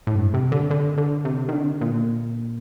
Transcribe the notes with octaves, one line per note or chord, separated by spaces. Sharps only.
A2
G2
C3
D3
D3
D3
C3
D#3
D3
A#2